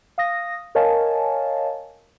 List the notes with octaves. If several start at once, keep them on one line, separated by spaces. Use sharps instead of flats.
F5 D#6 A#6
A#4 C#5 D#5 F5 G#5 A5